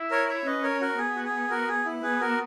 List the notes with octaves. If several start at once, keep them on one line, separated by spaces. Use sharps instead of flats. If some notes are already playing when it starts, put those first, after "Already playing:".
Already playing: E4
A#4 C#5
C#5 E5
C#4 B4 D#5
A#4 C#5
F#4 A#4
B3 G#4
F#4
G#4
F#4 A#4
G#4
E4
B3 G#4 B4
F#4 A#4